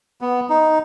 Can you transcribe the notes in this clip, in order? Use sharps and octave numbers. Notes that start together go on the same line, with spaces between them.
B3
D#4